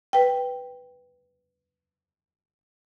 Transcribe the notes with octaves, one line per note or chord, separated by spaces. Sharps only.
B4 G5